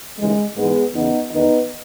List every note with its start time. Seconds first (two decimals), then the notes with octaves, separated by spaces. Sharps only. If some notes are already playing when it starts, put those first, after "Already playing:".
0.18 D#2 C#3 E3 G#3
0.56 G#2 E3 G#3 B3
0.93 E2 C#3 E3 B3 D#4
1.31 E2 D#3 B3 D#4